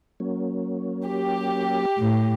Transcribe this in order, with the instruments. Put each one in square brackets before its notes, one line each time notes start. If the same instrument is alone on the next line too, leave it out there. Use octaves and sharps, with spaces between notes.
[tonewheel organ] F#3 A#3 C#4
[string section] G4
[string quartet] A2